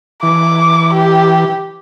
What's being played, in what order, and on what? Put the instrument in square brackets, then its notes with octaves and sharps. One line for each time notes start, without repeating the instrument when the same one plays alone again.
[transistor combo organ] E3 [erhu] D6
[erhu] G4